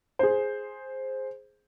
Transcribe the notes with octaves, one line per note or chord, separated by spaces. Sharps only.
G#4 C5